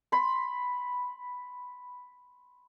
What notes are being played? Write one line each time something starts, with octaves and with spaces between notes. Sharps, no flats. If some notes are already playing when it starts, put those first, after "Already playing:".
B5 C6